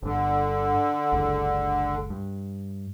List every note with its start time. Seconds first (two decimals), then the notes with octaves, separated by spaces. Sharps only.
0.03 G1 G2 D3
1.12 F#1 C#2
2.10 G2